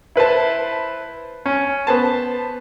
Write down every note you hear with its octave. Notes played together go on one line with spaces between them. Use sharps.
E4 B4 C5 A5
C#4
B3 C5 A5